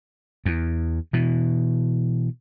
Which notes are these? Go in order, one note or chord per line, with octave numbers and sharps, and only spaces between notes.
E2
B2 E3